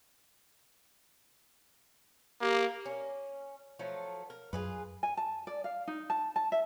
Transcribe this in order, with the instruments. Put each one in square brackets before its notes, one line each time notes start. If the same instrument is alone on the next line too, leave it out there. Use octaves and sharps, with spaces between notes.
[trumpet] A#3 [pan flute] G4
[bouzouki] C#4
F3 F#3 A3
A#4
[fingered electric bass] F#2 [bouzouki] F4 G#4 B4
[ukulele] G#5
A5
D5
F5
D#4
A5
A5
E5